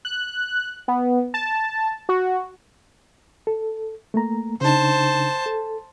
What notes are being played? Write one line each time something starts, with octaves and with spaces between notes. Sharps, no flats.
F#6
B3
A5
F#4
A4
A3 A#3 A#5
C#3 D4 D#4 C5 A5
A4